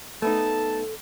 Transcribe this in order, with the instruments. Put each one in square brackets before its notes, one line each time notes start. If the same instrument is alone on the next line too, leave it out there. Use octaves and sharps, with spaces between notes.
[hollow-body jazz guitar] A3 B3 D#4 [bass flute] A4 [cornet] A5